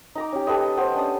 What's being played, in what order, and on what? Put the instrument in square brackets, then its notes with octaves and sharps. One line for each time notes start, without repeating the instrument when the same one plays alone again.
[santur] D#4 A#5 D6
C#4 G4
G4 A4 B4 D#5
B3 C5
C#4 D4 D#6